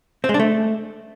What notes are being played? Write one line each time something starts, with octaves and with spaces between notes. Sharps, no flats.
C4
G#3
D4
A3